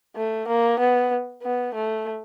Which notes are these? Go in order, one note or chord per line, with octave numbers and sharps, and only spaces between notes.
A3
A#3
B3
B3
A3